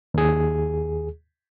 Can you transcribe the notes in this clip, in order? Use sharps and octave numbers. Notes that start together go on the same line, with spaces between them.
D#2 G#4